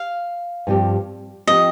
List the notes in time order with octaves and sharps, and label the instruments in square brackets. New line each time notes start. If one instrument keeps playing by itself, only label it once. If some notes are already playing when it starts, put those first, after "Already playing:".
Already playing: [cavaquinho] F5
[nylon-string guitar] G2 F3 C4 G4
[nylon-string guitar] F3 C4 G4 [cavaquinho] D#5